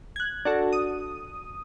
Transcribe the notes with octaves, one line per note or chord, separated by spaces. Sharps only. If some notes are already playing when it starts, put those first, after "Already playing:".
F#6 G#6
D4 F#4 A4
D#6